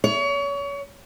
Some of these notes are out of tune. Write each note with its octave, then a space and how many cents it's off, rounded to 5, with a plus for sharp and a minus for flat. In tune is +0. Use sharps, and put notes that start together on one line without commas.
C#5 +30